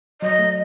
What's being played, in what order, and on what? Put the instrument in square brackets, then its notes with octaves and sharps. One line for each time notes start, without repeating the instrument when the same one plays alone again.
[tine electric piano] F#3 [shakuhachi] D#5
[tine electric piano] A3